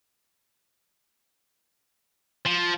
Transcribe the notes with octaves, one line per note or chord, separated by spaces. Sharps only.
F3